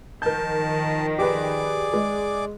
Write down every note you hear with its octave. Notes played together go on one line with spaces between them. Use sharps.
D#3 F3 A#4 A5 G6
G4 G#4 B4 D5 D6
G#3